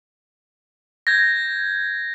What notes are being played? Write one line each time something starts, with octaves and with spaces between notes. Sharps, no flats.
G6 G#6 A#6